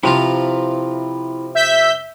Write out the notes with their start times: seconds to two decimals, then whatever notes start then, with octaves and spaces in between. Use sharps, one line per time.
0.04 C3 F3 E4 F4 B4 A#5
1.55 E5 G6 B6